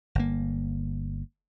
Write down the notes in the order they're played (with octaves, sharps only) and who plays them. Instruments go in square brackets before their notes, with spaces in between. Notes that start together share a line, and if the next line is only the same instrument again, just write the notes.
[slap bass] G1 A#3